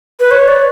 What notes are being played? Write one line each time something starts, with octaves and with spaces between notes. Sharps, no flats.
B4
C#5
D5